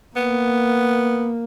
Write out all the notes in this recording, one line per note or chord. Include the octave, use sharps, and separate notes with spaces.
A#3 B3